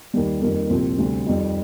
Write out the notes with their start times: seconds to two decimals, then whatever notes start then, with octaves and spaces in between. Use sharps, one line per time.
0.14 D#2 D#3 G3
0.42 F2 D#3 G3 A#3
0.69 C2 A#2 F3 C4
0.98 D2 C3 G3
1.26 F2 D#3 G3